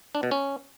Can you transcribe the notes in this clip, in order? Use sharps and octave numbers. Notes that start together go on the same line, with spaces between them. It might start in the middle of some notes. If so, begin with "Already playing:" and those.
D4
B2
C#4